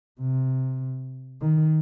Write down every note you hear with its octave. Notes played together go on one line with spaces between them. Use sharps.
C3
D#3